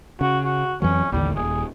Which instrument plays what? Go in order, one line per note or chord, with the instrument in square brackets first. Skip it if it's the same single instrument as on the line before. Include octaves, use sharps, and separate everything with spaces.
[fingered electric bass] C#3 [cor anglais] F#4
[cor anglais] F#4
[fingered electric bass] F2 E3 F#3 [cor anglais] C#4
[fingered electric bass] A1 D#2 D3 [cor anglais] G3
[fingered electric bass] D#1 [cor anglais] G#4